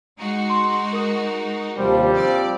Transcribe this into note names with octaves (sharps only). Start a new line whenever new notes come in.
G#3 D#4 F#4
C6
A#4 D#6
D#2 C3 F3 G3 D4 C5
F3 C4 D5